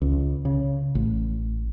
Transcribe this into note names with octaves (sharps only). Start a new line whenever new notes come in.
C#2
C#3
A1